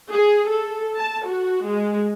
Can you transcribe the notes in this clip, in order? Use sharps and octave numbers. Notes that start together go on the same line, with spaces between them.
G#4
A4
A5
F#4
G#3